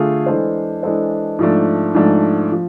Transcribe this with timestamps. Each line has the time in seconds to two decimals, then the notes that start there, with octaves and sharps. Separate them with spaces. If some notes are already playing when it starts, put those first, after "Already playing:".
Already playing: D3 A3 F4 G#4
0.26 E3 G#3 D4 A4 C5
0.83 E3 G#3 D4 A4 C5
1.39 G#2 F3 A3 D4
1.95 G#2 F3 A3 D4
2.52 F3